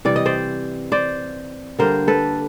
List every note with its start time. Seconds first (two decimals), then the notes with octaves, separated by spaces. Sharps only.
0.05 C3 E3 G3 D5
0.16 D#5
0.26 C5 D5
0.92 C5 D5
1.79 D3 G3 A#3 A#4 C5
2.08 A4 B4